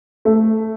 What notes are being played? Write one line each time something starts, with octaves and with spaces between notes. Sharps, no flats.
A3